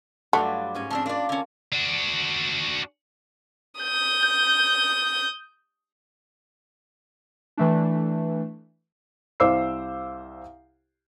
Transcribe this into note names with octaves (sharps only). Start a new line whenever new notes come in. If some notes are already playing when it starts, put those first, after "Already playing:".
G2 F#3 G3 A3 F4 F#4
G#2 C#4 G#5
F3 C4 D4
A#3 D4 F4 D5
D3 C#4
D4 F#4
D#6 G6
E3 A3 D4
C2 C5 F5 D6 E6 C7